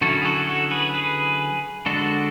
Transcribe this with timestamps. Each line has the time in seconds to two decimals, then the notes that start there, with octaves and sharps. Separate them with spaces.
0.01 D3 F#3 C#4 E4 F#4 A4
0.22 G#4
0.25 F#4 A4
0.48 F#4 A4
0.71 G#4 B4
0.94 G#4 B4
1.86 D3 G#3 D4 F#4 A4